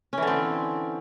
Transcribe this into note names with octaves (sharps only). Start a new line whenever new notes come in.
D3 E3 C4 C#4